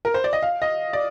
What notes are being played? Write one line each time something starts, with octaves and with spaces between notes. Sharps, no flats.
A#4
C5
D5
D#5
F5
D#5
D5